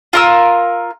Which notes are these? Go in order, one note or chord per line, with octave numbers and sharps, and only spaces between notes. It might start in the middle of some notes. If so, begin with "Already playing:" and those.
F4 A#4 E6